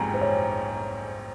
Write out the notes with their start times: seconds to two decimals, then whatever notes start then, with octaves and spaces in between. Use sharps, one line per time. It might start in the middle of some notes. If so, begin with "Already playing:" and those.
Already playing: A#1 G#2 G3 C4 G5 G#5 A#5
0.14 C5
0.21 C#5